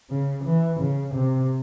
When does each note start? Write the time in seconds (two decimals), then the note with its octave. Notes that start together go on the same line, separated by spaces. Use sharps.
0.10 C#3
0.45 E3
0.80 C#3
1.15 C3